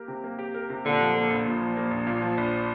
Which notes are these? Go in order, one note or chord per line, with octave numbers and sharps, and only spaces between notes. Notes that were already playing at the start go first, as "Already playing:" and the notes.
Already playing: A#3 G4 A#4
C3
A#3
G4
A#4
C3
A#2 D3
F3
A#3
A#1
A#2
F3
A#3
A#1
A#2
F3
A#1